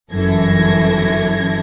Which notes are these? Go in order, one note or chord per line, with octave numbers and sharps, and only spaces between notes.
G1 F#2 E3 A4 G#6 A#6